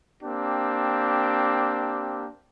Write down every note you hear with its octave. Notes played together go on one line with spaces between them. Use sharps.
A#3 C4 D4 G4